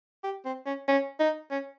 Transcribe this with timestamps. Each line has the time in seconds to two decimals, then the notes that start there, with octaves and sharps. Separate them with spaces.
0.23 G4
0.45 C4
0.66 C#4
0.88 C#4
1.19 D#4
1.51 C#4